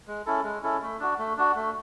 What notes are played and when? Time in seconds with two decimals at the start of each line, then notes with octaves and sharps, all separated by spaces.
0.07 G#3
0.26 C#4 E4 A4
0.44 G#3
0.63 C#4 E4 A4
0.82 A3
1.00 D4 F#4
1.18 A3
1.37 D4 F#4
1.56 A3